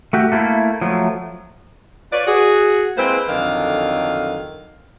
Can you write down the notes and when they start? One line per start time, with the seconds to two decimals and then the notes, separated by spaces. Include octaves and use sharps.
0.13 A3 F#4 G4
0.32 A3 A#3 E4
0.81 F3 F#3 A3
2.12 F4 B4 C#5 D5
2.27 F#4 G#4
2.97 G#3 A#3 C4 E4 B4 C5
3.29 F2 D3 D#3 F#3 A#4 F5